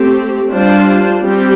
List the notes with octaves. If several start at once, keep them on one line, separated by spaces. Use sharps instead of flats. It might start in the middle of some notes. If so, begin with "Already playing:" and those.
Already playing: A3 C4 G4
G3 D4 F4 C5
G3 C4 G4